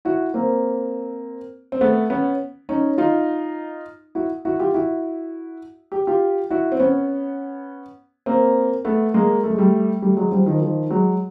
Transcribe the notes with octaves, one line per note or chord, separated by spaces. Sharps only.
E4 F#4
A#3 C4
C4
A3 B3
B3 C#4
C#4 D#4
D#4 F4
E4 F#4
E4 F#4
F4 G4
E4 F#4
G4
F4 G4
E4 F#4
C4
B3 C#4
A#3 C4
A3 B3
G#3 A#3
A3
G#3
G3 A3
G3 A3
F#3 G#3
F3 G3
D#3 F3
D#3 F3
F#3 G#3